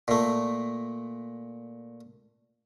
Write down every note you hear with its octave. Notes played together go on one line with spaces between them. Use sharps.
A#2 A3